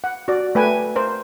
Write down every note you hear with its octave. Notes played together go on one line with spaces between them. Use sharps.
F#5
F#4 D5
A3 B4 G5 G#5
A#4 C5